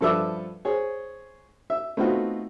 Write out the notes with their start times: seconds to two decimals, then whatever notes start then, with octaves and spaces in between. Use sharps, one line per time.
0.01 G2 F3 A4 B4 E5 D6
0.65 G#4 C5 C#5
1.70 E5
1.97 A3 B3 C4 D#4 F4 F#4